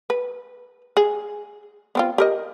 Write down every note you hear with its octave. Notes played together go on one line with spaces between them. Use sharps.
B4
G#4
B3 C4 F4
G4 A#4 D#5